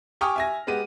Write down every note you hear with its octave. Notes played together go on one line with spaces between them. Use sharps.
G4 G5 G#5 C#6 D#6 F6
E5 G#5 A#6
G#3 B3 G4 D#7